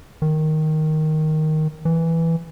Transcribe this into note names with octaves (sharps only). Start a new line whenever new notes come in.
D#3
E3